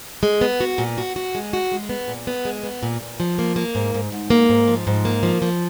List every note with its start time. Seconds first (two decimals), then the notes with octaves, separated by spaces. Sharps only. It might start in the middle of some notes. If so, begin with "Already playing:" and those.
0.23 G#3
0.41 B3
0.60 F#4
0.78 A#2
0.98 F#4
1.16 F#4
1.35 G#3
1.53 F#4
1.72 G#3
1.89 B3
2.08 A#2
2.27 B3
2.45 G#3
2.63 B3
2.83 A#2
3.01 A#2
3.20 F3
3.39 A#3
3.56 A#3
3.75 G#2
3.94 G#2
4.12 G#2
4.30 A#3
4.49 G#2
4.68 F3
4.87 G#2
5.05 A#3
5.23 F3
5.42 F3